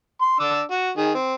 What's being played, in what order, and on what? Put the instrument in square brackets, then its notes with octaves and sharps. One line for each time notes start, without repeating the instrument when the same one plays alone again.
[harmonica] C6
D4 D6 E6
F#4
D#3 G#4
C4